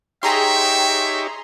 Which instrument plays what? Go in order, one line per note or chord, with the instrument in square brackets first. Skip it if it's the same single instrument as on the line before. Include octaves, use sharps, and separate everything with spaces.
[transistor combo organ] D#4 G4 C#5 [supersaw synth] G#4 A#5 C6 [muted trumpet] E5 [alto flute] G5